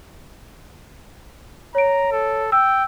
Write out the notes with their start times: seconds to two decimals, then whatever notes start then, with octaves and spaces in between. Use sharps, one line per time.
1.75 C#5 A#5 D7
2.12 A4
2.52 G5 E6